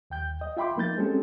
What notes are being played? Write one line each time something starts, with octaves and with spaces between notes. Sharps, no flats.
D#2 G5 G6
D#5
F4 E5 G5 B5 C6 D6
F3 A#3 D#4 G6 A6
G#3 C4 C#4 G4 A4